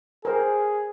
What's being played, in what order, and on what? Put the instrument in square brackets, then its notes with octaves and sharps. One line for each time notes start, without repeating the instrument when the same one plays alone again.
[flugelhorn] G#4 [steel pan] A#4 C5